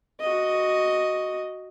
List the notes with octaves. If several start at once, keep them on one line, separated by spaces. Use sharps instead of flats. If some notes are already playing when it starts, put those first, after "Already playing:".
F#4 D#5